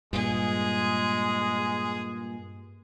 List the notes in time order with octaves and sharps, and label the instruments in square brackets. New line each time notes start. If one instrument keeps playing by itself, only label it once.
[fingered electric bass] G2 A#2 [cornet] G#3 [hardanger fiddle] G#4